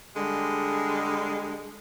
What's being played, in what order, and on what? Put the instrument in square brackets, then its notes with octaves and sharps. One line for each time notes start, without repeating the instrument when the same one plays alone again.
[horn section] D3 G3 G#3